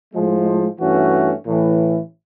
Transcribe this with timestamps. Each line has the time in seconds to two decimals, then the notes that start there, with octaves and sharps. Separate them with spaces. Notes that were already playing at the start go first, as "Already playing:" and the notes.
0.14 A2 F3 G#3
0.80 G2 E3 A3 C#4 F#4
1.46 A1 A2 E3